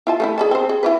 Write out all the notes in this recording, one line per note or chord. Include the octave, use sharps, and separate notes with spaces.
E4 F4 A5
A3 C#4 E4
G#4 D5 A5
C4 C5
G#4
E4 G4 B4